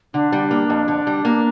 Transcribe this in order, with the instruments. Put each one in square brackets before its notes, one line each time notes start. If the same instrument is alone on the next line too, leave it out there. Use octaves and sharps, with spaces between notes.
[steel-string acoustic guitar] D3 [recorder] D4
[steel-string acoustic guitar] G3
A#3
F2
D3
G3
A#3